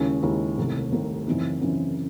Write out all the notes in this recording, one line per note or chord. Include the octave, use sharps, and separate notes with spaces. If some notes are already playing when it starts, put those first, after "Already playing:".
Already playing: D#2 C#3 G#3 C#4 E4
D#2 C#3 G#3 C#4 E4
C2 C3 D#3 A3
C2 C3 D#3 A3
F#2 C#3 E3 C4 D#4
F#2 C#3 E3 C4 D#4